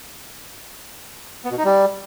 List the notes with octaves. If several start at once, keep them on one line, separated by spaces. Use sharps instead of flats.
B3
B2
D#4
G3